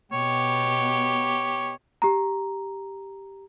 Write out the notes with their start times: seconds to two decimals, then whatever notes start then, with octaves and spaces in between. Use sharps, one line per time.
0.12 B2 B3 G4 C#5
2.02 G4 A#5